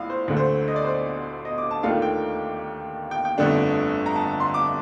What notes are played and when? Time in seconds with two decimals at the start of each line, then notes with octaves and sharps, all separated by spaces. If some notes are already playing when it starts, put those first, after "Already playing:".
Already playing: A#1 A2 F5
0.10 C5
0.28 D2 D3 A3
0.37 C5
0.68 D#5
0.76 D5
0.84 C5
0.94 D5
1.45 D#5
1.58 D6
1.71 A5
1.83 D#2 D#3 A3 D4 F4 F5
2.02 G5
3.11 G5
3.25 G5
3.38 G1 F2 D3 A3 D4
4.06 A#5
4.16 A5
4.40 C6
4.54 D6